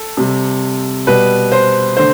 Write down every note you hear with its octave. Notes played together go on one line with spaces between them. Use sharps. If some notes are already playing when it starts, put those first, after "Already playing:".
Already playing: A4
C3 G3
B2 G3 B4
C5
D3 A3 C5